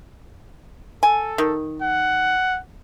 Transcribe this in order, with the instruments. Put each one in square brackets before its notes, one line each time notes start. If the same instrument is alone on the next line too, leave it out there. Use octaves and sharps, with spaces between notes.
[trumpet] A4 [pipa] G#5
[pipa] D#3
[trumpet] F#5